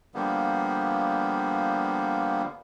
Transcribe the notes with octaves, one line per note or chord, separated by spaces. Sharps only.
D3 F3 G3 A#3 B3